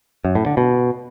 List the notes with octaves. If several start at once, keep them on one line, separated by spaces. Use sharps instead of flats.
F#2
A2
D3
B2